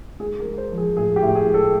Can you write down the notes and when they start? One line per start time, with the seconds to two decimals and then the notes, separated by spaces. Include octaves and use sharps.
0.20 G#3 G#4
0.40 A#4
0.45 G#3
0.58 C5
0.72 F3
0.78 G#4
0.97 A2 G#4
1.16 G4
1.23 A2
1.35 G#4
1.48 G#3
1.54 A4